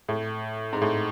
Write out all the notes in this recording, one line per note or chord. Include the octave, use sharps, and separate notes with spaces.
A2
G#2
A2